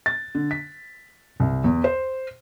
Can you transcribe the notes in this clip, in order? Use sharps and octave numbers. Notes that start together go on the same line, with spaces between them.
A6
D3
B6
C2
E2
C5